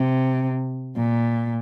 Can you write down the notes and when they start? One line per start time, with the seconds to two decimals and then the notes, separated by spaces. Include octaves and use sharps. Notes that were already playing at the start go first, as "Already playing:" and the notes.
Already playing: C3
0.96 A#2